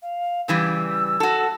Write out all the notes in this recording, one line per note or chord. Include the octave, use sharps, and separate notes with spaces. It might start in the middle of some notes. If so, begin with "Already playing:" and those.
F5
C#3 E3 G3 E6
F#4 A4